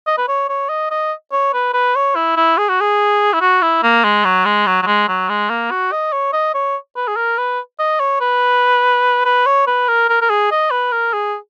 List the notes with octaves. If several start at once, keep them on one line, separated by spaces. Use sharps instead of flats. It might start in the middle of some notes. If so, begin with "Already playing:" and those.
D#5
B4
C#5
C#5
D#5
D#5
C#5
B4
B4
C#5
E4
E4
G#4
F#4
G#4
E4
F#4
E4
A#3
G#3
F#3
G#3
F#3
F#3
G#3
F#3
G#3
A#3
F#4
D#5
C#5
D#5
C#5
B4
G#4
A#4
B4
D#5
C#5
B4
B4
C#5
B4
A#4
A#4
A#4
G#4
D#5
B4
A#4
G#4